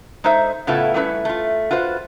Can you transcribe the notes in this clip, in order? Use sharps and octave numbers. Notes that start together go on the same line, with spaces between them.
G#3 D#4 A4 C5 E5
A2 C#3 B3 E4 F4 A4
G3 A3 C#4 E4 G#4 B4
A3 F4
F4 F#4 B4 C5